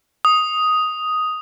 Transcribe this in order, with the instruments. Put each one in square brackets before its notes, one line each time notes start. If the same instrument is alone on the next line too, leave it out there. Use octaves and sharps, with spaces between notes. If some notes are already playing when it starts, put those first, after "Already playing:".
[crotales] D#6